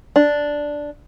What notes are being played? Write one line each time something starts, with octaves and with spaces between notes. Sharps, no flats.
D4